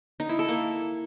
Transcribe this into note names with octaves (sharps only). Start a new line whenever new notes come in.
D#4
E4
A4
A#3